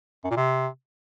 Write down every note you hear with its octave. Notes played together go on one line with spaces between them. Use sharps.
F#2
A#2
C3